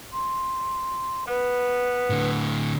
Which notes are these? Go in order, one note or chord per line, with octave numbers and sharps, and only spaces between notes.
C6
B3 B4
A2 D3